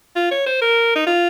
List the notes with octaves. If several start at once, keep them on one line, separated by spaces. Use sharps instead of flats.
F4
C#5
C5
A#4
D#4
F4